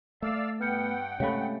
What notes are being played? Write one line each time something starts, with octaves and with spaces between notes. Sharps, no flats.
A3 D5 F5 E6
G2 B3 F#5 G5 F6 G6 C#7
C3 G#3 A3 C#4 C#5 F5 B5